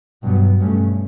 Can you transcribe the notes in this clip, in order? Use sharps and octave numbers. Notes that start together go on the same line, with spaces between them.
G2 B2 F#3 B3
G2 B2 A3 C#4